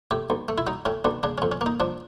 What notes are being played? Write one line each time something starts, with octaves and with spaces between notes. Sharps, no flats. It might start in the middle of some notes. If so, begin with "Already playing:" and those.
A2 G4
B1
A3
E4
F#3 D#4
A2 C#4
B1 D4
C#3 D4
C#4
F2
C#4
A#3
D#4
F3 D4